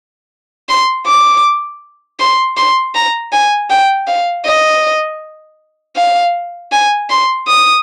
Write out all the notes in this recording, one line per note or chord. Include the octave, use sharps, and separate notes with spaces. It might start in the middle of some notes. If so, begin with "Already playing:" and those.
C6
D6
C6
C6
A#5
G#5
G5
F5
D#5
F5
G#5
C6
D#6